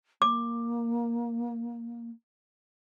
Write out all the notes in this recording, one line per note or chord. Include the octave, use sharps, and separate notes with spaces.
A#3 D6